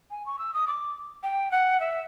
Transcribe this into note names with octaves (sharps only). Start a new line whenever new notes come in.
G#5
C#6
E6
D#6
D6
G5
F#5
E5